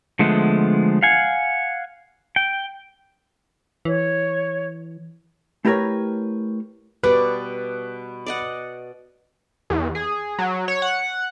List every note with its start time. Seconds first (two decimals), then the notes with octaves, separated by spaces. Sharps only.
0.19 D3 F3 G#3 A3 B3
1.02 F5 F#5 G#5
2.36 G5
3.85 E3 C#5
5.65 A3 E4 G4 A#4 B4 C#5
7.03 B2 G3 B4 D5
8.26 D5 D#5 F#5
9.70 E2
9.95 G#4
10.39 F#3
10.68 C#5
10.82 F#5